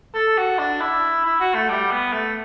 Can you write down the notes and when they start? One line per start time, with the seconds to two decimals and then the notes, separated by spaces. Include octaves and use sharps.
0.14 A4
0.37 F#4
0.59 D4
0.81 E4
1.25 E4
1.41 F#4
1.55 A3
1.69 G3
1.91 B3
2.13 A3